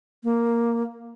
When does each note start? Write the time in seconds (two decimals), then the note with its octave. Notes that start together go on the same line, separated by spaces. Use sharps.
0.24 A#3